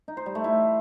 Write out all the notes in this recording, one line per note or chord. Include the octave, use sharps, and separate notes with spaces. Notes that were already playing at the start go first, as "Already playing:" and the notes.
D#4
C5
G3
A3
E4